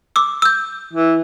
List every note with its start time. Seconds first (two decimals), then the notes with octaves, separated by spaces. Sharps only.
0.16 D6 E6
0.42 E6 G6
0.93 E3